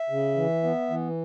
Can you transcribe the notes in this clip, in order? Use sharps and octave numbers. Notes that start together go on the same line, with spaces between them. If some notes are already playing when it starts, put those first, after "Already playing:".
Already playing: E5
C#3
E3
B3
E3